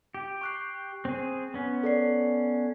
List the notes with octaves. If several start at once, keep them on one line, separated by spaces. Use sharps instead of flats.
G4
C#6 F#6 C7
C4 G#4
B3 C#4
A4 D5 C7